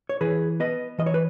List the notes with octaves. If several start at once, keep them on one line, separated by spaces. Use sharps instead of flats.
C#5
E3 G#4 B4
B3 B4 D#5
E3 D#5
C#5
B4